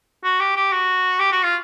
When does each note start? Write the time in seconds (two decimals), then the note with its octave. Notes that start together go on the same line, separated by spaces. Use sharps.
0.24 F#4
0.40 G4
0.56 G4
0.72 F#4
1.20 G4
1.32 F#4
1.43 F4